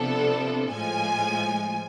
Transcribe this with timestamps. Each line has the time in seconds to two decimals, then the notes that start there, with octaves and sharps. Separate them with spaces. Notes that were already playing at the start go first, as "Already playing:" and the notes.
Already playing: C3 F3 B3 D4 A4
0.72 A2 F3 G#3 G#5